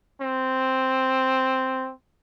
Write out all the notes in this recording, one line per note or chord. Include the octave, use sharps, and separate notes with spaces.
C4